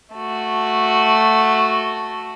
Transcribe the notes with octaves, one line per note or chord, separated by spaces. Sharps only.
A3 F#4